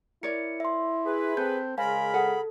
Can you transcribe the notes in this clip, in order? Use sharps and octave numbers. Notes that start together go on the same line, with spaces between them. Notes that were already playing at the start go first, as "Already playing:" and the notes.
E4 A#4 C#5 D5 C#7
E5 C6
G#4 B4
C4 A4 G6
C#3 G#3 A#4 C5 F5 G#5 B5
G#4 A4 B4 F#5